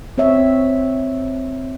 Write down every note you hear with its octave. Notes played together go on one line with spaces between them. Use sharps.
C4 C#5 E5